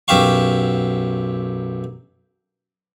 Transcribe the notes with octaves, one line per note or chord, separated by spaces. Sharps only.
B1 F#2 G4 E5 F5 C#6